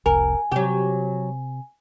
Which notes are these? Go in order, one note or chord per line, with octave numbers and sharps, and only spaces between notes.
F1 C2 A#4 G#5
C3 F#3 G4